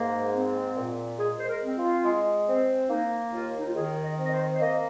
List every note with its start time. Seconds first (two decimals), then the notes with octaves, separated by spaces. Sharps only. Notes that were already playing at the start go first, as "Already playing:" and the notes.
Already playing: G#2 A#3
0.34 C4
0.76 A#2
1.18 G#3 G#4
1.39 C5
1.48 A#4
1.62 C4
1.76 F4
2.05 G#3
2.47 C4
2.89 A#3 D#4
3.32 D#2 F4
3.59 D#4
3.66 F4
3.74 D#3 G#4
4.04 D#5
4.18 C4
4.24 D#5
4.31 C5
4.52 C5
4.60 A#3 D#5